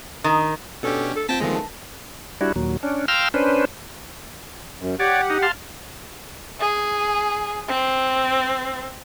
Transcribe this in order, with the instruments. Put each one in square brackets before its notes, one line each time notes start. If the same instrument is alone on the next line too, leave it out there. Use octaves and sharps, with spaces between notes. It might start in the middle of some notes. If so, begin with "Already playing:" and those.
[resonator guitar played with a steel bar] D#3
[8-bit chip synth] B2 C#4 G4 [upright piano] D4 [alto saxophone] A4
[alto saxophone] A4
[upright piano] C4 F4 [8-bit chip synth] G5 A#6 B6 [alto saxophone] A5
[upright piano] E2 D#3 A#6 [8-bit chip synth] F3 G#3 [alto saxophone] A3
[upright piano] A5
[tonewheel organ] G3 D4 E4 F#4
D#2 A#2 F#3
C#4 D4
F5 G5 A#5 C6 E6 F6
C#4 D4 B4 C5
[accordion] F#2
[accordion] G4 F#5 [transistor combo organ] C#5 D5
[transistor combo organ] D#4
F5 A5 C6
[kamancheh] G#4
C4